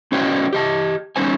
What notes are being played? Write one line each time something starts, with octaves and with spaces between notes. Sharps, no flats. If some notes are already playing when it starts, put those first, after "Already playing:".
C#4 F#4 C5 D5 D#5 G5
G4 D#5 A5
G3 C#4 D#4 C5 G#5